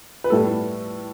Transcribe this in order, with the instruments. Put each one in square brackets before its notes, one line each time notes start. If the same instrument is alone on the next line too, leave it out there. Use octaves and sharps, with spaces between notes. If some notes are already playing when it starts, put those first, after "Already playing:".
[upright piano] B4
A2 G3 B3 A4